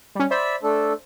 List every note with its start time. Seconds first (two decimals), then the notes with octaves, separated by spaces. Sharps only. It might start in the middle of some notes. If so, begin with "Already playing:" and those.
0.15 G3 C#4
0.31 C5 D5 E5 B5
0.63 A3 D4 A4